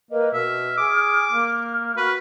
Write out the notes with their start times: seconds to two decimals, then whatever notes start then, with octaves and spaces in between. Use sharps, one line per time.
0.11 A#3 A#4 B4 D#5
0.34 B2 E5 F6
0.78 G#4 D6
1.31 A#3
1.97 F#4 B4